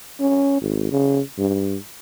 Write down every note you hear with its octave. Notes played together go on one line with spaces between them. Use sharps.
C#4
G#1
C#3
G2